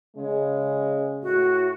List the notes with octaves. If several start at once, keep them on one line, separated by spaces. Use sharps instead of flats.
C#3 G#3
A2 F#4